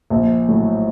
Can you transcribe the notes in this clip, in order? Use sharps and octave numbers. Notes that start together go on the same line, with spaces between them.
A#1
A2 F#3